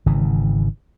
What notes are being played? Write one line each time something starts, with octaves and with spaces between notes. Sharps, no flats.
G#1 C#3 E3